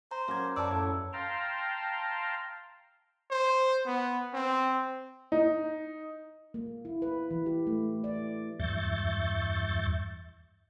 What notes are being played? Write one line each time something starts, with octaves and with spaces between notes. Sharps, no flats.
C5 A#5
F#3 A#3 C#4 A#5 D6 G#6
F#2 B4 D5 A5 B5 C#6 E6
A2 A4 G#6
F5 G5 A5 A#5 C6
C5
B3
C4
D#4
A#3
E4
B4
E3
G4
A3
D5
E2 G2 E5 C#6 G6 A6